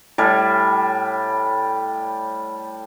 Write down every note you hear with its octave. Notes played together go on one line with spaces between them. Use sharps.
A2 G3 G#5